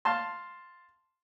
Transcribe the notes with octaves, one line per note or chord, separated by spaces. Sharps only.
F5 A5 C6